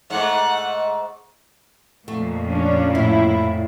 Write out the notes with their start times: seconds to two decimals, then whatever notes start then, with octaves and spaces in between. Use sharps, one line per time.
0.10 G#2 A3 F#5
2.08 F2 A#2 A3
2.46 C#4 D4
2.95 A2 E4